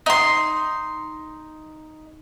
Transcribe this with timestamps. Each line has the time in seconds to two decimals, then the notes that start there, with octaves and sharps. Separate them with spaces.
0.06 D#4 C6